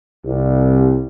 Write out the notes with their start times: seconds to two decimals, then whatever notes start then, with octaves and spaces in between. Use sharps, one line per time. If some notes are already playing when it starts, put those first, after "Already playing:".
0.25 C2